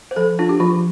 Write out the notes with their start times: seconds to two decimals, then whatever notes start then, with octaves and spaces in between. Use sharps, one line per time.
0.11 C5
0.16 F3 A4
0.39 D4 F4
0.49 G4
0.60 F3 F4